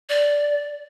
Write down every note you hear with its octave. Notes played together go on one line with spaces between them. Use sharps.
D5